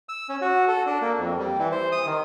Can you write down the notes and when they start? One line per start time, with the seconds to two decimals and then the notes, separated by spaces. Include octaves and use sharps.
0.09 E6
0.29 C#4
0.42 F#4
0.68 A4
0.86 D4
1.02 A#3
1.18 F2
1.39 G3
1.59 E3
1.72 C5
1.92 D#6
2.06 D#3